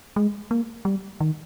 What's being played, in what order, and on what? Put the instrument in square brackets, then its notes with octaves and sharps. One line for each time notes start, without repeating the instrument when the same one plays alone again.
[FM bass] G#3
A#3
G3
D#3